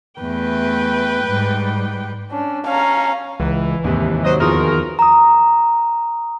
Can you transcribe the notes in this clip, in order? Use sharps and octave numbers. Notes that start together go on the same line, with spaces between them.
E2 A3 B4 G5
G#2 G3
C#4 D4
C#4 F5 A5 A#5
C#2 E3
D#2 G#2 C3
F#3 C5 D#5
E2 F3 F4 F#4 G#4 A#4
A#5 D#6